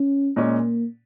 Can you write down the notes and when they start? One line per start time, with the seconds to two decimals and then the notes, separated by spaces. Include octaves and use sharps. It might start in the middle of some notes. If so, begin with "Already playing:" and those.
Already playing: C#4
0.36 A#2 G#3 A#3 C#4